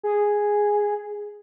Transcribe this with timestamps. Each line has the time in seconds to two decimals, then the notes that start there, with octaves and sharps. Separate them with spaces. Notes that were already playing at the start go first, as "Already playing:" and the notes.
0.03 G#4